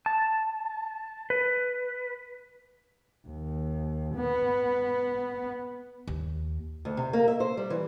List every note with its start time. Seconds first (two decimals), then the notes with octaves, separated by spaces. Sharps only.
0.06 A5
1.30 B4
3.27 D#2
4.16 B3
6.07 D#2
6.85 D2
6.97 C3
7.13 A#3
7.28 E5
7.40 C5
7.57 G3
7.70 E3